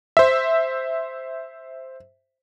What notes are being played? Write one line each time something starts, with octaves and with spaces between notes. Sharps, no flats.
C5 E5